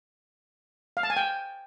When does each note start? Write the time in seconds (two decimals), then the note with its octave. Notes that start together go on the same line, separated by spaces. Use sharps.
0.97 F5
1.03 A5
1.10 G#5
1.17 G5